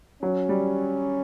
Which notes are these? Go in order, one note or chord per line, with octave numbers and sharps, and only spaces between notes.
F#3 C#4
G3